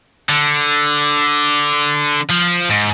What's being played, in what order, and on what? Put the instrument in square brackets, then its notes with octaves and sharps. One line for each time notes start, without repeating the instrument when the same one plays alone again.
[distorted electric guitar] D3
F3
G#2